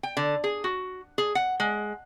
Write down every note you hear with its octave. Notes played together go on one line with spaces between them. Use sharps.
G5
D3
G#4
F#4
G#4
F#5
G#3